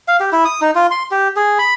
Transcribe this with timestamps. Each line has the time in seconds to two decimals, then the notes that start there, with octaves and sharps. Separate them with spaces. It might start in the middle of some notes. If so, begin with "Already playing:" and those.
0.08 F5
0.20 G4
0.32 E4
0.45 D#6
0.61 D#4
0.75 F4
0.91 C6
1.11 G4
1.36 G#4
1.59 B5